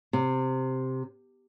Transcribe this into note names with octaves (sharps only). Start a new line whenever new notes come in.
C3